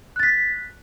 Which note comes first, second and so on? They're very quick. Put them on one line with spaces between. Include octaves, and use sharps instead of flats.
F#6 A6 B6